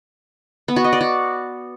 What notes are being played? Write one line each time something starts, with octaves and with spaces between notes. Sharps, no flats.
B3
F#4
D#5
D5
F#4